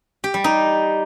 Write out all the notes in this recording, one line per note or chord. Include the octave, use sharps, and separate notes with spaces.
G4
G3
D#4